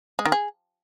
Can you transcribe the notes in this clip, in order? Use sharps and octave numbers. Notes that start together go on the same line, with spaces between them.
G#3
D#3
G#4